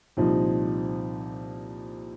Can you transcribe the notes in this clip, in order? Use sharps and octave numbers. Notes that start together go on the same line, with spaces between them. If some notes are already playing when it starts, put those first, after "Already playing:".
C2 A#2 F3 C4 D#4